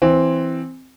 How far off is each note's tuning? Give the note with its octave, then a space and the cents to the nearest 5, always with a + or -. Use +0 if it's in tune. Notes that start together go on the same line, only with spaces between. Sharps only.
E3 +0 C4 +0